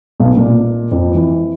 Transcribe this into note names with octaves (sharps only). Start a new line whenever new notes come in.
B1
A#2
F2
E3